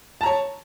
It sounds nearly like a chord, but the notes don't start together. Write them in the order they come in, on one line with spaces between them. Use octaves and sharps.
A5 A#5 C#5